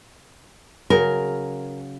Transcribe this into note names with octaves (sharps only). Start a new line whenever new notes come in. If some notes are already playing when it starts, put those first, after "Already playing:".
C#3 F#3 A#4